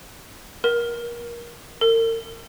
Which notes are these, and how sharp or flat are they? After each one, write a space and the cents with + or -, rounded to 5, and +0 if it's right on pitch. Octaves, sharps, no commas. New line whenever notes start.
A#4 +25
A#4 -40